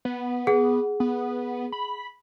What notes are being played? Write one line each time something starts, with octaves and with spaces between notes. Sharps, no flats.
B3
G#4 F#5
B3
B5